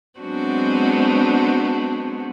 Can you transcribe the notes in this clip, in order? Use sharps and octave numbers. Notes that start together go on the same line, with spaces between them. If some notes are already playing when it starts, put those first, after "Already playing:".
F#3 G#3 B3 C4 D4 F#4